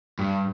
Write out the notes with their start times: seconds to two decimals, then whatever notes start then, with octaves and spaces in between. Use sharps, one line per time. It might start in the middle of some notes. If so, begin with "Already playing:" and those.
0.19 G2